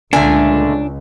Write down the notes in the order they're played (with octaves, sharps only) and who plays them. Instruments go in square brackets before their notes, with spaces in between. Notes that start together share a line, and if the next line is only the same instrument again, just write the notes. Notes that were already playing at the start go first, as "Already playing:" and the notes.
[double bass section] C#2 [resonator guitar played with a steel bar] A#2 D3 A3 [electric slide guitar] D4 [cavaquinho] G#5